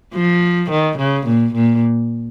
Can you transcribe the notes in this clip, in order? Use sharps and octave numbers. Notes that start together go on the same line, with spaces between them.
F3
D#3
C#3
A#2
A#2